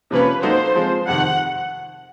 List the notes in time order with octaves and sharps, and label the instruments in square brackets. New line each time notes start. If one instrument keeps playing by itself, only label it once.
[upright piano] C3 F3 A#3 C#4 [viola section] B4
[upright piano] F#3 A#3 D#4 F#4 A4 [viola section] C5
[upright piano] F3 G#3 C4
[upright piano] F2 C3 D#3 [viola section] F#5